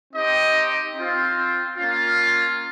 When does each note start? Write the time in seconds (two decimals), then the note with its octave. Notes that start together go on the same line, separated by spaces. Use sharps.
0.13 C4 D#4 G4 D#5
0.95 C4 F4
1.77 A#3 C#4 F4